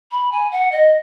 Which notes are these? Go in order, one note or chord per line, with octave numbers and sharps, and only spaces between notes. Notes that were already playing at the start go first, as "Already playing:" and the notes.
B5
G#5
F#5
D#5